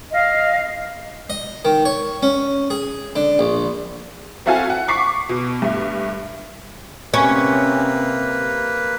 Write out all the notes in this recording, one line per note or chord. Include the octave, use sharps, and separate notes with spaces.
D#5 F5
D#5
D#3
C#5
C#4
G#4
D3
A#1
C4 E4 F#4 A4 F5 G#5
F#5
C#6 D6 B6 C7
B2
G2 A3
C3 A#3 C#4 B4